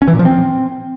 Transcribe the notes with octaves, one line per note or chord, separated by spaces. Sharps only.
C#4
E3
A#2
F3
C4